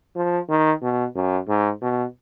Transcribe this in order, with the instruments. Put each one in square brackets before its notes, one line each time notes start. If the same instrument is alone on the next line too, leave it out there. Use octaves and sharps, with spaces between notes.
[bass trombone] F3
D#3
B2
F#2
G#2
B2